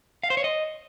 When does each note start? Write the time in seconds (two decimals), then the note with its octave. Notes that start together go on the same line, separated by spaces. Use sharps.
0.23 F5
0.30 C5
0.37 C#5
0.44 D#5